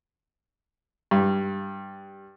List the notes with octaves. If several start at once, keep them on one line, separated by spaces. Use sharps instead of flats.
G2